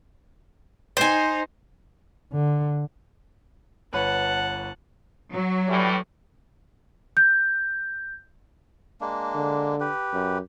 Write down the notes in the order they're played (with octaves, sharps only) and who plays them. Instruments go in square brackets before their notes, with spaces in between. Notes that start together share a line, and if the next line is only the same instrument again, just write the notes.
[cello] D#4 [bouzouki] C5 G#5
[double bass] D3
[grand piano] G1 B4 C#5 [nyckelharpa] F#5 A5
[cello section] F#3
[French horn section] A2 E3 G3
[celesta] G6
[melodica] G#3 A#3 D4
[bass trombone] D3
[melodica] G4 B4
[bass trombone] F#2